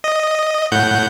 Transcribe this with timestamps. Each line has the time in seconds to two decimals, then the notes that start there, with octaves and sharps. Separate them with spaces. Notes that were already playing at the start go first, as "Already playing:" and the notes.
0.04 D#5
0.72 A2 F#5 G6